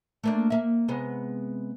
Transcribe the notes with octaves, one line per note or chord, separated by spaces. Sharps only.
A3 A#3 D4
A#3 E5
C3 G#3 B3